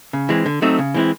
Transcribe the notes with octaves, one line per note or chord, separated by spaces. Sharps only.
C#3
E3 G#3 C4
D3
F#3 A3 C4 D#4
C#3
E3 G#3 C4 E4